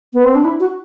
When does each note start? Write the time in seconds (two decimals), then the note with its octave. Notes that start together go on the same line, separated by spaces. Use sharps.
0.14 B3
0.25 C4
0.35 D4
0.45 E4
0.60 F#4